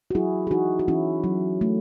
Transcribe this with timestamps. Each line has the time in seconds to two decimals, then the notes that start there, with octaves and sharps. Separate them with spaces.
0.11 F#4
0.15 F#3 E4 G#4
0.47 G#4
0.51 E3 D#4 F#4
0.79 F#4
0.88 E3 C#4 E4
1.24 F#3
1.61 A3